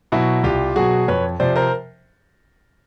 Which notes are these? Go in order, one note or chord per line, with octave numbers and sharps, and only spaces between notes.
B2 F#3 E4 F#4
C2 F4 G4
B2 F#3 F#4 G#4
F2 B4 C#5
C3 F3 C5 D5
A#4 C5